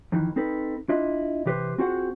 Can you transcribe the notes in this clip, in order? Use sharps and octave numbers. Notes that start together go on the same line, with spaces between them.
F2 D#3 E3
C4 D#4 A4 B4
D4 E4 F4 D#5
C3 E3 G4 B4 C5
C4 F4 F#4 G#4 C5 F#5